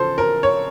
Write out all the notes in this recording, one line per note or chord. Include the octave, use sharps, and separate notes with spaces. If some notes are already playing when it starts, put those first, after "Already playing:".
Already playing: C#3 F3 A4 C5
A#4
C#5